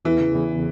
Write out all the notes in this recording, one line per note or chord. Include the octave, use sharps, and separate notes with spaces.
E2 E3
C#3
E2